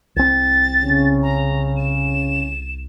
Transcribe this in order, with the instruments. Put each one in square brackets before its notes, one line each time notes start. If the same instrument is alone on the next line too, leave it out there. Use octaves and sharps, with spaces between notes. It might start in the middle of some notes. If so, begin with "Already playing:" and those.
[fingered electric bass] C2 C4 [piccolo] A6
[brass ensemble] C#3 C#4
[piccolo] A#5
E7